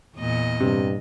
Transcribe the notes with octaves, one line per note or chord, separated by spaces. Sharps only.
E2 A#2 D#5
G2 C3